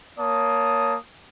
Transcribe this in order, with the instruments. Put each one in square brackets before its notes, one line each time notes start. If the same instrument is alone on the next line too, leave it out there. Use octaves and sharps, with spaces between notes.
[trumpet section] A#3 C#5 A5 D#6